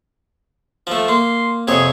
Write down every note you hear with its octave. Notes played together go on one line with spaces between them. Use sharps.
F3 A3
A#3 C6
F2 C3 G#4 C#5